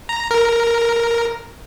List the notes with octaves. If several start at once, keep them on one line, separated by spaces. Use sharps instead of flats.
A#5
A#4